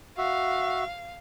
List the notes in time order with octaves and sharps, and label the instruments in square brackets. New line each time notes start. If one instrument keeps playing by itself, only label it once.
[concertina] F#4 E5 [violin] F5